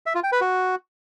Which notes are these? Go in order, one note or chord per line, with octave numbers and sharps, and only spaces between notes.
E5
F4
G5
B4
F#4